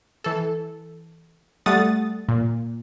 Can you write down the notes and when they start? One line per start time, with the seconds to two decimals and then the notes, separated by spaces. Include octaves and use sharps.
0.24 E3 A4
1.66 G3 A3 A4 F#5 D#6 A6
2.29 A#2